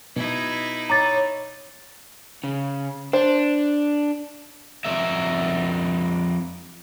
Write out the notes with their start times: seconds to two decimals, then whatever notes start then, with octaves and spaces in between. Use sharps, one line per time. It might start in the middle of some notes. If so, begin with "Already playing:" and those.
0.16 B2 D#4 E4 G#6
0.90 C#5 A#5 D6 A6
2.44 C#3
3.13 D4 C5
4.85 F2 A#4 E5